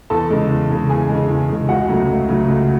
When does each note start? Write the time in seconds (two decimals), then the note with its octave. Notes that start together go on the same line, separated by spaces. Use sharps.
0.10 E2 A4 A5
0.30 C#3 G#3
0.49 E2
0.70 C#3 G#3
0.89 E2 G#4 G#5
1.09 C#3 G#3
1.29 E2
1.49 C#3 G#3
1.69 C#2 F#4 F#5
1.88 C#3 F#3 A3
2.09 C#2
2.29 C#3 F#3 A3
2.48 C#2